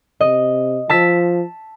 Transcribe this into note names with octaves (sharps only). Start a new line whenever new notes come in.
C3 D#5
F3 A5 E6 B6